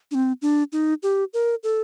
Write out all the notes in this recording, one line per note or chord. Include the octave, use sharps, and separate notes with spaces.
D4
C4
D4
D#4
G4
A#4
A4